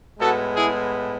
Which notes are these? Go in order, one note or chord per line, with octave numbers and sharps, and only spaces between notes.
A2 G#3 B3 F#4 A4
E4 G#4